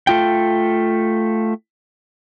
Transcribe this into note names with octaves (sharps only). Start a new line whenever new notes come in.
A3 F4 G5